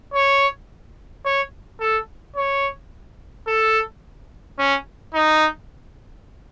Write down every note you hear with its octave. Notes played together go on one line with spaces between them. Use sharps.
C#5
C#5
A4
C#5
A4
C#4
D#4